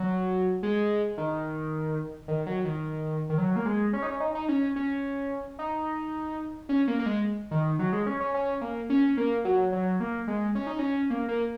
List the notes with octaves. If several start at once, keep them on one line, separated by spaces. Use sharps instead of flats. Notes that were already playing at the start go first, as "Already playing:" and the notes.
Already playing: F#3
G#3
D#3
D#3
F#3
D#3
D#3
F#3
A#3
G#3
C#4
D#4
C#4
D#4
D#4
C#4
C#4
D#4
C#4
A#3
A#3
G#3
D#3
F#3
G#3
C#4
C#4
C#4
A#3
C#4
A#3
F#3
F#3
A#3
G#3
C#4
D#4
C#4
A#3
A#3